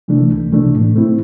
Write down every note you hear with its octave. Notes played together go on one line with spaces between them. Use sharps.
C3 E3 A3 D4
C2
C3 E3 A3 D4
A2
A3 C4 E4